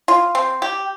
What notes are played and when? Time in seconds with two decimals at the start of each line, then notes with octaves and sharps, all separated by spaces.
0.08 F4
0.35 C4
0.62 G4